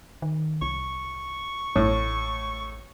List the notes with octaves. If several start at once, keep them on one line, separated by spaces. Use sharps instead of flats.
D#3
C2 C#6
A1 A2